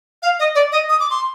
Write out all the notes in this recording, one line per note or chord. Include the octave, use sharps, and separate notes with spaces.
F5
D#5
D5
D#5
D#6
D6
C6